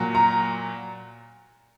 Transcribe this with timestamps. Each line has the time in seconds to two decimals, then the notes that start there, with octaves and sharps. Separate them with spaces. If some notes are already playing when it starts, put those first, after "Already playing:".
Already playing: A#2 F#3
0.15 A#5